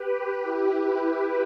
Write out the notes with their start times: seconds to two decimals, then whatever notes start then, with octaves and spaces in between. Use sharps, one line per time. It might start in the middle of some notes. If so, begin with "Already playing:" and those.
Already playing: G4 B4
0.37 E4